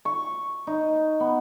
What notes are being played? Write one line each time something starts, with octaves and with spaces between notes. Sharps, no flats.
C#6
D#4
B3